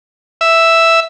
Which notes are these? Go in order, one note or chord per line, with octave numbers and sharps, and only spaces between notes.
E5